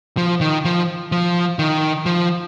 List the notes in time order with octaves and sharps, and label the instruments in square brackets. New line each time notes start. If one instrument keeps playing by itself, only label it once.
[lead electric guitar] F3
D#3
F3
F3
D#3
F3